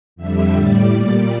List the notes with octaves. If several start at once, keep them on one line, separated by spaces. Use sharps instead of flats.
F2 D3 G3 E5
A2 G3 D5
A#2 G3